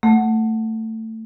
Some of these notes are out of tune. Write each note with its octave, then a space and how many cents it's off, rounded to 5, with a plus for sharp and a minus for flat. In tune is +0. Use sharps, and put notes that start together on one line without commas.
A3 +20 F#5 +0